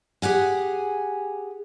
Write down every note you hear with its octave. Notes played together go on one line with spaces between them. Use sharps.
G4 G#4 F#5 G#5